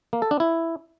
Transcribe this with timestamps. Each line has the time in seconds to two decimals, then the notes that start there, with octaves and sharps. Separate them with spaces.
0.13 A#3
0.22 A4
0.31 D4
0.40 E4